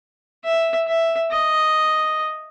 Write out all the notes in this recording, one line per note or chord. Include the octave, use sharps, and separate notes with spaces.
E5
E5
D#5